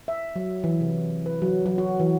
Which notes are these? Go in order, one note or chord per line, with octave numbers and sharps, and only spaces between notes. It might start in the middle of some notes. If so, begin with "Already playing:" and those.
E5
F#3
E3
C3
B4
F#3
F#3
F#4
E3